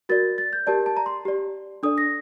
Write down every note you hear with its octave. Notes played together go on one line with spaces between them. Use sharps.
F#4 A#4 D5 A6
A6
G6
G4 A#4 D5 A5
A5
A#5
C6
G4 D5
D4 A4 D5 D#6
A#6